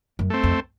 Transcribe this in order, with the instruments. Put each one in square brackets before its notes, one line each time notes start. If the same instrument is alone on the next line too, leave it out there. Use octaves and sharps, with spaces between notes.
[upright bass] F#2
[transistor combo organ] A3 C4
[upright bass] F2